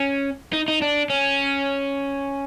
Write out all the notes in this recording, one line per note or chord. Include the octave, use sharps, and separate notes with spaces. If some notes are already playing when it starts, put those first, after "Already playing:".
Already playing: C#4
D#4
D#4
D4
C#4